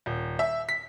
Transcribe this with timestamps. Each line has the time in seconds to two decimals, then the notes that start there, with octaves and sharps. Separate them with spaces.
0.06 D#1
0.39 E5
0.69 B6